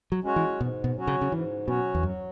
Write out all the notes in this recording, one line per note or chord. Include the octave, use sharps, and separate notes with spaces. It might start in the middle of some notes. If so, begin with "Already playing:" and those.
F#3
G#3 C#4 F#4 C#5
E3
G#2 B2
B2
F#3 C#4 F#4 C#5
C#3
C#3
G#2 E3
B2 F#3 C#4 F#4 C#5
E2
F#2 F#3